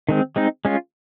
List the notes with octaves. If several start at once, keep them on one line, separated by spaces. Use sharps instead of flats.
D#3 G#3 C4
G#3 C4 D#4
G#3 C#4 F4